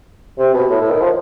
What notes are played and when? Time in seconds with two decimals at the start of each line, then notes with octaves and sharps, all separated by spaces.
0.38 C3
0.54 B2
0.70 A2
0.81 A2
0.91 D#3
1.01 F3